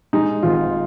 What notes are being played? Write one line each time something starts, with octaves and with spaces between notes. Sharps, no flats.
G#3 D#4
G#1 F4